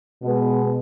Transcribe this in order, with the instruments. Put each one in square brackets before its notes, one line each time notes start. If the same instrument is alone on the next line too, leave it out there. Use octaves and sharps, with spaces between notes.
[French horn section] B2 G#3 B3